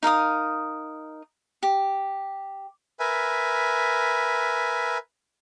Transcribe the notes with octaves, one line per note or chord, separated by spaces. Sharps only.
D#4 A#4 F5 D#6
G4
A#4 B4 E5 G#5